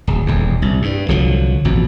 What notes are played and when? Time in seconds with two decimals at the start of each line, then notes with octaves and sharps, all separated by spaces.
0.07 D1
0.26 D#1 E2
0.62 C2
0.82 G2
1.08 C2 D3 F3 F#3
1.65 A1 F2 B2